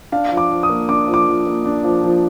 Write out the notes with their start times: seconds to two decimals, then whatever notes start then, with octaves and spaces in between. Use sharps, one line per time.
0.12 D4 F5
0.31 F3
0.37 D6
0.51 F3
0.63 D#6
0.69 A#3
0.89 D4 D6
1.07 F3
1.14 D6
1.27 F3
1.47 A#3
1.66 D4
1.84 F3
2.04 F3